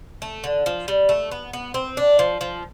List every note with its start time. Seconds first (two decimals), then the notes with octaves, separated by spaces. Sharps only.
0.22 A3
0.44 D3
0.66 F3
0.88 G3
1.09 A3
1.32 B3
1.53 B3
1.74 C4
1.97 D4
2.19 F3
2.41 F3